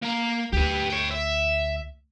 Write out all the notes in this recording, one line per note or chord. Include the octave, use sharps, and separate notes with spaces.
A#3 A#5
D2 G4 B4
C#5 G5
E5